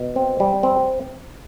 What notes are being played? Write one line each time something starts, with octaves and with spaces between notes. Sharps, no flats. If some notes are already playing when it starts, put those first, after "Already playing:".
Already playing: B2
C4
G3
C4